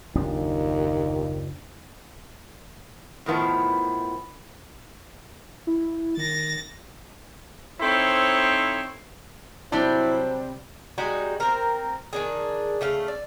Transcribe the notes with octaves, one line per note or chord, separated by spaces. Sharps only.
F#1 D#2 F3 D4
A2 D#3 F3 B3 E4
E4
D#3 A6 A#6
C4 D#4 E4 A4 C5 C#5
C3 F#3 G3 D4 E4 C5
G3 G#3 D#4 F#4
C4 A#4
D#3 D4 G#4
C#3 A3 F5
D5